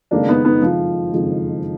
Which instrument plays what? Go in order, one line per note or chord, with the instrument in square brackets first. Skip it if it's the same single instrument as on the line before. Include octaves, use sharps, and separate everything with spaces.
[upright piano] F#1 F2 D#3 G#3 [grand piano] A#3 D4
[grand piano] B3 D#4
B3 D#4
[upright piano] F#1 F2 D#3 G#3 [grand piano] F3
[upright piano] F#1 F2 D#3 G#3